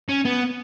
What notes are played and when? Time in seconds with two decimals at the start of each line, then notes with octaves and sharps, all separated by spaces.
0.09 C#4
0.25 B3